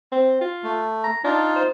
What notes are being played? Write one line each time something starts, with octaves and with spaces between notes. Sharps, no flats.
C4
F4
A3
A#5
D4 D#4 F4
C5